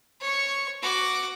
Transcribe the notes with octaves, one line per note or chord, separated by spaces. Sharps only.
C#5 C#6
F#4 D6